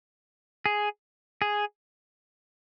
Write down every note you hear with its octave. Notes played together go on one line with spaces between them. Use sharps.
G#4
G#4